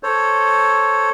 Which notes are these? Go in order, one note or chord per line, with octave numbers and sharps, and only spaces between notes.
A4 C5 C#5